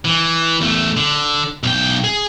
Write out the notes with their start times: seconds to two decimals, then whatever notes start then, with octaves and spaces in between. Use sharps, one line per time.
0.05 E3
0.61 E2 A3
0.97 D3
1.63 B1 G5
2.04 G#4